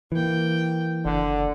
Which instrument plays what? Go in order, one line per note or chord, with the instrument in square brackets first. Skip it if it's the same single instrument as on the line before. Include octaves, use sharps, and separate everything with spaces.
[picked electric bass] E3 [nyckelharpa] A#3 G5
[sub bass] F#1 [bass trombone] D3 [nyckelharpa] D5